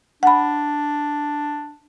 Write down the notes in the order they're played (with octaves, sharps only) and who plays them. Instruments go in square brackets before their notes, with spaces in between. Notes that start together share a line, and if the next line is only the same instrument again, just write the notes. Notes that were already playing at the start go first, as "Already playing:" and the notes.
[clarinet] D4 [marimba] F#5 B5